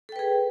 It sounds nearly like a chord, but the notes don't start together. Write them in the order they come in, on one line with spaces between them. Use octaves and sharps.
A4 G5 B4 G#4